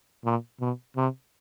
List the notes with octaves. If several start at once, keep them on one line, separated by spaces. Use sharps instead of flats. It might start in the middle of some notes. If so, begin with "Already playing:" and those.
A#2
B2
C3